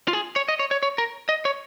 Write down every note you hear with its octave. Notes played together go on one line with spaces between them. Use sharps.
F4
G#4
C#5
D#5
C#5
C#5
C#5
A#4
D#5
C#5